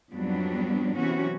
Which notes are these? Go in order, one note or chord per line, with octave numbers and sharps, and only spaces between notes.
F2 G#2 F#3 G3 B3 D4
C3 E3 F#3 B3 C#4 F#4